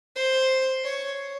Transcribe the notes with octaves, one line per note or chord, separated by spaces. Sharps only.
C5
C#5